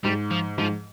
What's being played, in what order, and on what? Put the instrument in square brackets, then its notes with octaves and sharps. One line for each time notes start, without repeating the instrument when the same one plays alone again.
[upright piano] G#2 [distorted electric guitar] G3
[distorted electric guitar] F3
[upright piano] G#2 [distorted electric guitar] F3